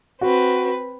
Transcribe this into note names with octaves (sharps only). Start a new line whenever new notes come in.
C4 F#4 B4